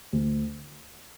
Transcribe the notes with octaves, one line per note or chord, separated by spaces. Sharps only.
D2